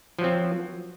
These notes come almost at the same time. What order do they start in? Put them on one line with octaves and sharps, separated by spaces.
F3 F#3 C4